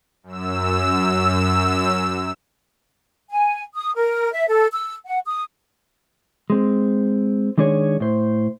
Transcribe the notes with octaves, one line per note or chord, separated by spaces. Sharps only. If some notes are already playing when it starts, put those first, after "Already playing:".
F#2 E6
G#5
D#6
A#4
E5
A4
E6
F#5
D#6
G#3 C4
D#3 G#3 D4 G#4 C#5
A2 C5